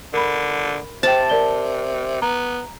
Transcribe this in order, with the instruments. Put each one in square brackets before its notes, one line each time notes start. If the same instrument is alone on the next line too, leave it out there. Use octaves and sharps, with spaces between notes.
[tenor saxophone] D3 [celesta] A#4 B5
[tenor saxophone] C3 [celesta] C5 G5 [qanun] A5
[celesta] A#4 D5 G7
[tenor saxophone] B3 [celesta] A#5